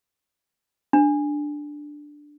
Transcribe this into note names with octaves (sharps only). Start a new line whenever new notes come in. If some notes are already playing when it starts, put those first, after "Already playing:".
D4